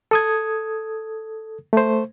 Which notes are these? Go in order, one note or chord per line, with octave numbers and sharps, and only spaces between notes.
A4 D#6 G#6
A3 C5